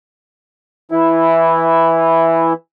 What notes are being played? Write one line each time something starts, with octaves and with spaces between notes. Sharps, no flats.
E3 E4